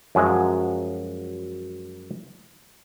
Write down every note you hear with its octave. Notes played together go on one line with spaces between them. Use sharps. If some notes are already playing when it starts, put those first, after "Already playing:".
F#2 F3 F#3 G#3